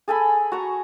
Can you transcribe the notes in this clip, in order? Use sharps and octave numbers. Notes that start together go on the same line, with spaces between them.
G#4 A4 G#5 B5
F#4 A#5 C#6